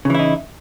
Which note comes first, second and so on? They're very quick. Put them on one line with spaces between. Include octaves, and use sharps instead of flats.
C#3 E3 E4 D#4